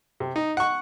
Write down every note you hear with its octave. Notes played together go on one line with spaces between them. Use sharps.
C3
D#4
F#5 C#6